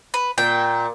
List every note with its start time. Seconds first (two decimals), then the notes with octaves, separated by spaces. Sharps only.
0.14 B4
0.38 A#2 G5